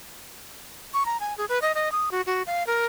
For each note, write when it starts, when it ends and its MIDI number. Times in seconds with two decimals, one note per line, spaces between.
0.94 1.04 85
1.06 1.17 82
1.20 1.36 80
1.38 1.45 68
1.49 1.59 71
1.62 1.72 75
1.75 1.91 75
1.92 2.09 87
2.11 2.22 66
2.26 2.43 66
2.47 2.66 77
2.67 2.86 70